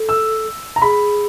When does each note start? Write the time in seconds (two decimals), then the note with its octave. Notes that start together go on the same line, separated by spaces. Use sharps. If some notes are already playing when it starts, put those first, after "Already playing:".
Already playing: A4
0.09 E6
0.76 A#5
0.82 G#4 B5